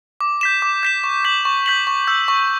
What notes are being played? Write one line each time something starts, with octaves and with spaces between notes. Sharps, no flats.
D6
G6 B6 E7
D6
G6 B6 E7
C#6
G6 B6 F#7
C#6
G6 B6 F#7
C#6
E6 G6
C#6